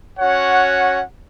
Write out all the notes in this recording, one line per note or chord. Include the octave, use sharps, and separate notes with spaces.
C#4 F#4 C#5 F#5